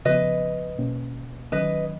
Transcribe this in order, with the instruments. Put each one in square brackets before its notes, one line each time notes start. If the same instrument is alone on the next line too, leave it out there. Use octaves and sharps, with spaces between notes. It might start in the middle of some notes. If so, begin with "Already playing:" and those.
[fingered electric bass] C#3 F3 B3 [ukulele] B4 D#5
[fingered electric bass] B2 A#3 C#4
[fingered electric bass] D#3 F#3 C#4 [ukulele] B4 D#5